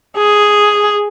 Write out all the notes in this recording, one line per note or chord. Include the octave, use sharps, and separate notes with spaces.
G#4